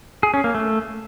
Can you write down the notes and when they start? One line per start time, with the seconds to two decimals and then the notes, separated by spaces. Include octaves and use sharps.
0.23 G#4
0.34 C#4
0.44 A#3
0.55 A3